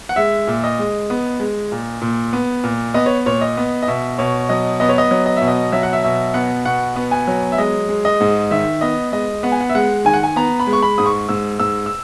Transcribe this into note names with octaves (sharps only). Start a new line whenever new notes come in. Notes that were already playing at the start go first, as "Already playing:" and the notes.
F#5
G#3 E5
A#2
D#5
G#3
B3
G#3
A#2
A#2
B3
A#2
B3 D#5
C#5
A#2 C#5
D#5
B3
D#5
B2 E5
B2 C#5
F#3 D#5
B3 D#5
C#5
D#5
F#3
D#5
B2 E5
D#5
F#3 E5
F#5
E5
B2 E5
B3 F#5
B2 F#5
B3
G#5
F#3
E5
G#3 D#5
G#3
D#5
G#2
D#3 E5
B3 D#5
G#3 D#5
B3 F#5
G#5
F#5
E5
G#3 F#5
D#3 G#5
F#5
G#5
B3 A#5
B5
G#3
C#6
B5
G#2 D#6
C#6
G#2 E6
G#2 E6
E6